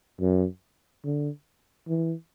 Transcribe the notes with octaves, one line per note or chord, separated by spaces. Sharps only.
F#2
D3
E3